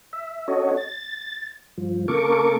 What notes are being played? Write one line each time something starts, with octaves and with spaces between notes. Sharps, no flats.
E5
C#4 F#4 A4 C#5 D#5
A6
G2 F3
C#3 A#3 A4 A#4 C#6 D6